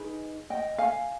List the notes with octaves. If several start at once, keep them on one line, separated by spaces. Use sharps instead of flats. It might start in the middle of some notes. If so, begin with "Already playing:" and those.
Already playing: D#4 G#4 B4
D#5 G5
F5 G#5